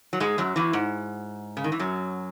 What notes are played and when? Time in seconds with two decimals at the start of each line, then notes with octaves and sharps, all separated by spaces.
0.13 F#3
0.20 G#2 G#3
0.38 F#2 F#3
0.56 E2 E3
0.73 G#2
1.57 C#3
1.64 D#3
1.72 E3
1.79 F#2 F#3